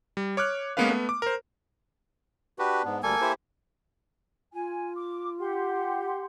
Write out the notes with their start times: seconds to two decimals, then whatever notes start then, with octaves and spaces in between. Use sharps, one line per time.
0.17 G3
0.37 C#5 D6 F6 F#6
0.77 G#3 A#3 B3 C#4 B4 F5
0.90 A3 B3
1.09 D6
1.22 A#4 C5
2.59 D4 F#4 G4 B4
2.85 G#2 B3
3.03 D2 G3 A#3 A4 G#5
3.21 E4 G4 C5
4.54 F4 G#5
4.97 D6
5.40 G4 F#5 C6